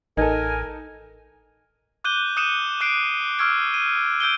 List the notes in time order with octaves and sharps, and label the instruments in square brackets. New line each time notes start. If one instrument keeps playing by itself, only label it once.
[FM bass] A1 [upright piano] D#4 A4 [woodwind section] A#4 G#5
[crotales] D6 F#6 G6 D#7 G7
D#6 F#6 C#7 D#7 E7
D6 F#6 C7 D7
C#6 E6 F6 G#6 D7
D#7
E6 G6 D7 G7